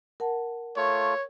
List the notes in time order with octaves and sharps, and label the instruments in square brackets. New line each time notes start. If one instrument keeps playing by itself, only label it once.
[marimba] A#4 F#5 A5
[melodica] A3 F4 [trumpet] C#5